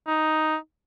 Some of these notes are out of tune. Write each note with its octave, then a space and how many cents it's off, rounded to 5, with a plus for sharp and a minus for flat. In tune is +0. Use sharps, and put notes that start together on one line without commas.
D#4 +5